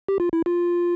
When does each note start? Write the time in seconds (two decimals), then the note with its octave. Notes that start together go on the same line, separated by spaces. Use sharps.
0.08 G4
0.20 F4
0.33 E4
0.46 F4